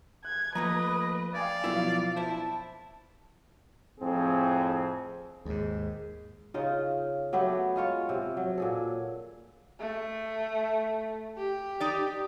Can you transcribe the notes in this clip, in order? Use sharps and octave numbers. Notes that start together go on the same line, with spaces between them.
F#6 G#6
F3 A3 A#3 B4 D#5 A#5
D5 F5 G5 G#5 G#6
B2 F3 F#3 B3 E4 F5
E4 C5 A5
F2 A2 C4 G#4
D#2 G#2 G#3
C#3 D#4 F4
F#3 A3 B3 G4
G#3 F4 C#5
C3
F#3
A#2 G#4 A4
A3
G4
D#4 D5